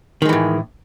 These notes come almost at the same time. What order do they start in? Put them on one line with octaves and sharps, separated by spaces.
D#3 G#3 E3 A2